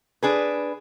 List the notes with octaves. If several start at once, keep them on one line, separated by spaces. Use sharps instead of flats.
D4 G#4 B4